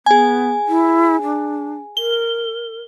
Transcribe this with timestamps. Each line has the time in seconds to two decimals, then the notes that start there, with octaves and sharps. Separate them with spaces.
0.06 B3 G#4 G#5
0.68 E4
1.23 D4
1.97 A#4 G7